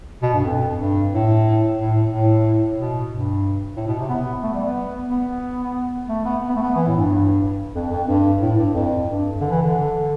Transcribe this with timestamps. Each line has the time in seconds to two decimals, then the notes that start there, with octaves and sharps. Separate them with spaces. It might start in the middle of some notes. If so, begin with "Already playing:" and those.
0.23 B2
0.33 G2
0.45 F2
0.78 G2
1.12 A2
1.77 A2
2.10 A2
2.77 B2
3.10 G2
3.76 A2
3.87 B2
3.99 C3
4.09 B3
4.43 A3
4.54 G3
4.65 B3
5.09 B3
6.09 A3
6.25 B3
6.49 B3
6.56 A3
6.63 B3
6.76 E3
6.87 A2
6.97 G2
7.75 F2
7.91 F2
8.07 G2
8.41 A2
8.57 G2
8.74 F2
9.07 G2
9.41 D3
9.51 E3
9.62 D3